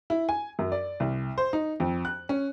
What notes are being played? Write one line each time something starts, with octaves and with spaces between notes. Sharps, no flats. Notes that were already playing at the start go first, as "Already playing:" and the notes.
E4
G#5
F#2
D5
C2
C5
D#4
F2
F#6
C#4